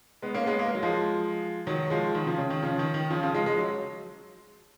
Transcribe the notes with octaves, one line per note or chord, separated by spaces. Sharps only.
G#3 B3
A#3 C#4
G#3 B3
A#3
G#3
F#3
F3 G#3
D#3 F#3
F3 G#3
D#3 F#3
C#3 F3
C#3
D#3
C#3 F3
D#3
D#3
C#3 F3
C#3 F3
F3 G#3
G#3
F#3